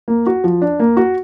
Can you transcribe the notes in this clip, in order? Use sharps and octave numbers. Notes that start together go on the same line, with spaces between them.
A#3
F#4
F3
D4
A#3
F#4